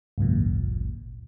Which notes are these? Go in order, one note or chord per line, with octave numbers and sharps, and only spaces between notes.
G#1 C#2 F#2 A#2